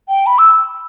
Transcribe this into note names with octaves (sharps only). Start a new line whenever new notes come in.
G5
B5
E6